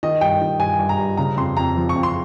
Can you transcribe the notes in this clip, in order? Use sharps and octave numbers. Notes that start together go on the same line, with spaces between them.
D#3 D#5
G2 G5
D#3
G2 G#5
G2
A#5
G2
C#3 A#5
F2 C6
F2 A#5
F3
C#6
F2
C6